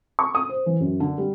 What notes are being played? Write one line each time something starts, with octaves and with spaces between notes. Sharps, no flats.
C#6
D#6
C5
E3
F#2
D3
G3